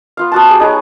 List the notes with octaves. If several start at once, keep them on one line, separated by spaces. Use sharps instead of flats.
B3 F4 F5
B3 F#4 A5
G4 G#4 G5
D#4 G#4 B4 C#5